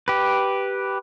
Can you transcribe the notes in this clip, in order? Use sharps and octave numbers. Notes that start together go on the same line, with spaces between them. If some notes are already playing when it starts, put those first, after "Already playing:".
G4 B4